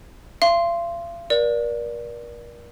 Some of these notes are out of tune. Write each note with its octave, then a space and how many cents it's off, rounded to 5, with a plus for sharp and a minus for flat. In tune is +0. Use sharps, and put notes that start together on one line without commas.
F5 -40 C6 +0
A#4 +40 D5 +0